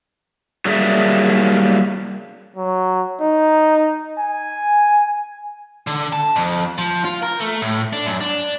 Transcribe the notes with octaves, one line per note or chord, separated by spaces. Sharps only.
F#3 G3 A#3 G#4 D5 E5
F#3
D#4
G#5
D3
A5
F2
F3
F4
A#4
A3
A2
D4
F#2
D4